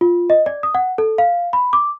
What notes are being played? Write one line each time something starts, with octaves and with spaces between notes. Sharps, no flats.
F4
D#5
D5
D#6
F#5
A4
F5
B5
D6